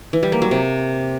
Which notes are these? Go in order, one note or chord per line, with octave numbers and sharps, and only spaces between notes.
E3
G3
A#3
F#3
C3